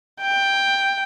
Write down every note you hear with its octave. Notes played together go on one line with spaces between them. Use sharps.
G5